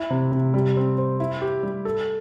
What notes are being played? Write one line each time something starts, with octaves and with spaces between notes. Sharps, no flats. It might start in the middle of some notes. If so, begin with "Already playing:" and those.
Already playing: E4
C3
C3
G3
C4
C5
E4
G4
G3
A4